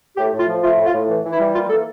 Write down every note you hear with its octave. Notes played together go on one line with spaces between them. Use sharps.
A2 G4
A2
F4
F3
A3 F4
A2
F4
A2
E3
E3
E4
G3
A#3 F4
E3 A4